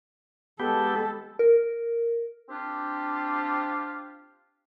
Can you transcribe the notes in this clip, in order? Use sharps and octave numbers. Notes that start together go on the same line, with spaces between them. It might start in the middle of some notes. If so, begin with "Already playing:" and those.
G#3 B3 G4 A4
A#4
C4 D4 F4 G4